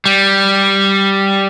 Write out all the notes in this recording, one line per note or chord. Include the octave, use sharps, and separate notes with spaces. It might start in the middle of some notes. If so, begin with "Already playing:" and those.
G3